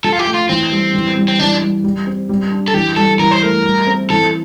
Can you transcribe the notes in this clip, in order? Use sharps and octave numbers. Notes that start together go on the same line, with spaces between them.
F3 A4
F4
G4
A3
F4
E3 C4
G3
E3
G3
C4
E3 D4
G3
G3
C4
G3
D4
A4
E3 G4
G3 A4
E3 A#4
C5
A3 A#4
G3
C4
E3 A4